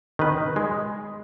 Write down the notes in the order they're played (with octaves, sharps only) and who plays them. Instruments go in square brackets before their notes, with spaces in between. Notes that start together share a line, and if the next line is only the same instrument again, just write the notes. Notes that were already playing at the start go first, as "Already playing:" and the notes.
[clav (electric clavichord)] D#3 B4
G#3